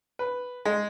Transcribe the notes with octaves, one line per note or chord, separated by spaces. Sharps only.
B4
G#3